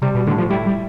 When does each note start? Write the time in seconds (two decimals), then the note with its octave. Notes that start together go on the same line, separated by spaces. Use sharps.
0.02 C3 G3
0.15 B2
0.27 A2 D3
0.38 F3
0.50 G3 E4
0.66 G3